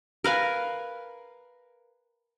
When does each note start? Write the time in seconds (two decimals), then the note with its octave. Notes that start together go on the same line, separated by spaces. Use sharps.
0.24 A#4 B4 F5 G#5